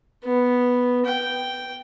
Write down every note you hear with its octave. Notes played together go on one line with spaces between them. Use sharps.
B3
G5